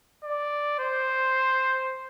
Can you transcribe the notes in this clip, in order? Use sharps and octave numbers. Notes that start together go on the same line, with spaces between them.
D5
C5